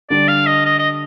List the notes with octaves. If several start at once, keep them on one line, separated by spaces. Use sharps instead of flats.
D3 G3 D4 D5
F5
D#5
D#5
D#5